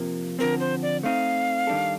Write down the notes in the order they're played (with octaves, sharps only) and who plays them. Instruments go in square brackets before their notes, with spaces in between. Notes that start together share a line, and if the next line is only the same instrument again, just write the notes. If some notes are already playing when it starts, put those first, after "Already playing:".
Already playing: [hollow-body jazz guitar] C3 F3 A#3
[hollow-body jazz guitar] D3 F3 C4 [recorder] A#4
[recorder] C5
D5
[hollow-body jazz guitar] A3 C4 D#4 [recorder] F5
[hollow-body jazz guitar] D#3 G3 D4 A4